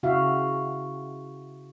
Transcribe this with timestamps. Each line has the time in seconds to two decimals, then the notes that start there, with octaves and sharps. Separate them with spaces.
0.03 C#3 E4 F#4 E5 F5